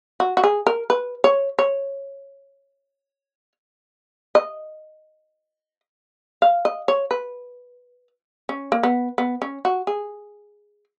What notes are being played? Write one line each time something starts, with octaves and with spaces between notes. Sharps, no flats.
F#4
F#4
G#4
A#4
B4
C#5
C#5
D#5
F5
D#5
C#5
B4
C#4
A#3
B3
B3
C#4
F#4
G#4